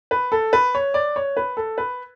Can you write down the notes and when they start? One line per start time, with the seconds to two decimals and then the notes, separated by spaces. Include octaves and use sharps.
0.11 B4
0.32 A4
0.53 B4
0.75 C#5
0.94 D5
1.16 C#5
1.37 B4
1.57 A4
1.78 B4